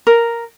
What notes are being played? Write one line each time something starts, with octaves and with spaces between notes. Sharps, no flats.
A#4